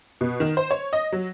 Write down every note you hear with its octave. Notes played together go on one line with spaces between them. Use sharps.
B2
D#3
C5
C#5
D#5
F#3